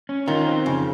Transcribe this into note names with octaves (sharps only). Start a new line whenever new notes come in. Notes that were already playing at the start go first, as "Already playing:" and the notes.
C#4
D#3 F4
C4
F2 C#3